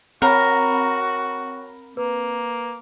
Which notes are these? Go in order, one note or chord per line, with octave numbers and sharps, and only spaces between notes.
C4 F#4 A#4 C#5 G5 A#5 B5
A#3 B4